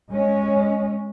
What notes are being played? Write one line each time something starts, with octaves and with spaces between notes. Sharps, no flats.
G#3 C#4